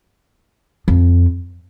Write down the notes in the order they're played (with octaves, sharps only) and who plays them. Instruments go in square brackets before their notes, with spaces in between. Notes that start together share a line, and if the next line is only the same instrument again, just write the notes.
[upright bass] F2